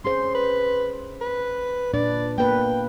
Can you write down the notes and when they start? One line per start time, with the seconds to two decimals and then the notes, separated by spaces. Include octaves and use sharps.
0.05 C#4 G#4 C5 C6
0.35 B4
1.21 B4
1.93 A#2 D4 B4 D5
2.38 A#3 B3 B4 G5